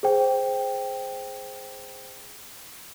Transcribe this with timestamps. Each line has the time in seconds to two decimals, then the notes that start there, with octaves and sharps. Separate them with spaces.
0.03 G#4 C5 G5